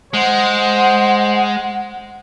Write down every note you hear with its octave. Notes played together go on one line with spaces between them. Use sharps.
G#3 C5 F#5